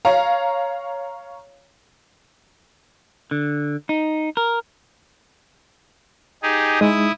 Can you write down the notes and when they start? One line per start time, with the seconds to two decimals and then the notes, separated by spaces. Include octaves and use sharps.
0.05 C#5 F5 A#5
3.31 D3
3.89 D#4
4.37 A#4
6.43 D#4 G4 G#4
6.81 G#3 D#4 E4 D#6